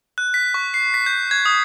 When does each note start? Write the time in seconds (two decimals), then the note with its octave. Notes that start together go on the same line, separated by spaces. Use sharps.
0.18 F#6
0.34 B6
0.54 C#6
0.74 C7
0.94 B6
1.06 G6
1.31 G#6
1.46 D#6